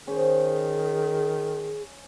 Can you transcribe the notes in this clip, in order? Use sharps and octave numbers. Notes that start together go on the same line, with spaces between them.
D#3 C#4 G#4 C5